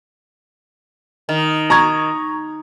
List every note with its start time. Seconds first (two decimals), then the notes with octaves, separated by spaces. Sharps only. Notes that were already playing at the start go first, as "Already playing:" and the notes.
1.29 D#3
1.70 A#5 C#6 G#6